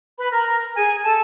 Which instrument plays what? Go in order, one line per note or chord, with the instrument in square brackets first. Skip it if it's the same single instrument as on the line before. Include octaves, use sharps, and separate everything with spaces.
[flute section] B4 B5
A#4 A#5
G#4 G#5
A4 A5